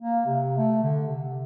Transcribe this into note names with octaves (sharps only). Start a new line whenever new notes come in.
A#3
C3
A3
D3
C3